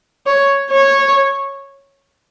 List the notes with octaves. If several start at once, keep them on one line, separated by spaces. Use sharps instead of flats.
C#5
C#5